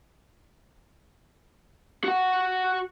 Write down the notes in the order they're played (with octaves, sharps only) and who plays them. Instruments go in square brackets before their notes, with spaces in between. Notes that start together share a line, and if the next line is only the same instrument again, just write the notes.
[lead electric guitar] F#4 F#5